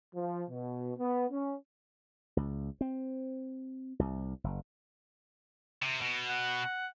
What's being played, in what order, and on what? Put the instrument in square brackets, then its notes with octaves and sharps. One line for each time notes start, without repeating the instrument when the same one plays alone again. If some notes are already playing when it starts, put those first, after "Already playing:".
[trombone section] F3
B2
B3
C#4
[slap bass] C#2
C4
C2
F#1
[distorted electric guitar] C3
B2
[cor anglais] F#5